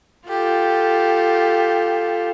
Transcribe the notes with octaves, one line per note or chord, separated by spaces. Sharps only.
F4 G4 A4